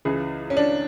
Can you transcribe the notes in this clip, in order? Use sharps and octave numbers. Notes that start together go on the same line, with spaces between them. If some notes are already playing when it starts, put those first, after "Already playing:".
C#2 C#3 E3 G#4
C#4
D4